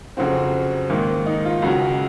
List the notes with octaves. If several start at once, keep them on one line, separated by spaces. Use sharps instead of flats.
F2 C#3 F#3 C4 F#4
G#2 D#3 A#3
D#4
F4
C#2 C#3 F#3 F#4